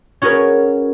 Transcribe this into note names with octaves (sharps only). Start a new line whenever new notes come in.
C#4 F#4 G#4 A#4 B4